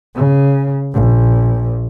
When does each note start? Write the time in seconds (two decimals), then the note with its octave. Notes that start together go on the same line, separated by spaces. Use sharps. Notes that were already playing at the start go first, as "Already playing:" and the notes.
0.15 C#3
0.93 A#1